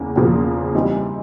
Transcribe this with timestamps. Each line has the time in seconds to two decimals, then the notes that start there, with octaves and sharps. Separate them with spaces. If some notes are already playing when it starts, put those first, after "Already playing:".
Already playing: E2 C#3 A#3
0.16 E2 C#3 F3 A#3
0.75 E3 G3 C4 D#4